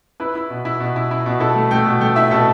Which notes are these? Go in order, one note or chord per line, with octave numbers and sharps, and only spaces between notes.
E4 B4
E4
B2
E4
B2
E4
E4
B2
E4 A4
A3
A3 G5
B2
A3 G5
E4 E5
B2 A4